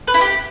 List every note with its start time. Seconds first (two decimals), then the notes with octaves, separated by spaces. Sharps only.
0.07 B4
0.14 E4
0.21 G4